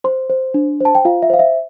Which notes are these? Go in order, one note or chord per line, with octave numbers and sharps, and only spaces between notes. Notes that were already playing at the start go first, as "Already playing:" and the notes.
C5 C6
C5
D4
C5 A5
G5
F4 F5
E5
C5 F5
E5